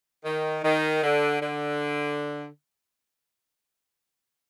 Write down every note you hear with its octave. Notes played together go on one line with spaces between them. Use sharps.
D#3
D#3
D3
D3